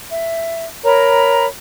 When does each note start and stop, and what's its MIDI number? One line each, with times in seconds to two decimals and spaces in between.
0.11 0.65 76
0.85 1.46 70
0.85 1.46 73
0.85 1.46 82
0.85 1.46 83